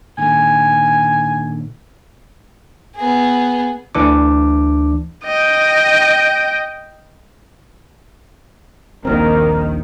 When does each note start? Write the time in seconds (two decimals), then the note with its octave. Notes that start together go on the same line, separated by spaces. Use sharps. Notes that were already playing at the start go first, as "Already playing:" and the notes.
0.18 A#2 D3 D#3 G#5
2.95 B3 G#4
3.95 D2 E3 D4 D6
5.25 D#5 G5
9.05 D#1 A#1 D#3 A#3 C4 A#4